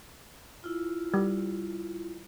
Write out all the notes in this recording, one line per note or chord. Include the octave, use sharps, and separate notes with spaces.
E4 F4
G3